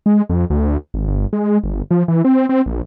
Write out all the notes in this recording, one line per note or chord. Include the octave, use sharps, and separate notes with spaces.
G#3
F2
D2
G#1
G1
G#3
G1
F3
E3
C4
C4
A#1